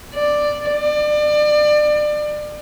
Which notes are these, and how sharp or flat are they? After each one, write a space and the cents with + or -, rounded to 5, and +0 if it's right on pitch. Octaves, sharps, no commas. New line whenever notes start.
D5 +5
D5 +30